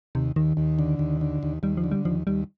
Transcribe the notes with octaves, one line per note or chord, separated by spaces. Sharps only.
D#2 C3
D#2 D#3
D#2
D3
D#2
D3
D#2
D#2 G3
F3
D3
G3
D#2 F3
D#2 G3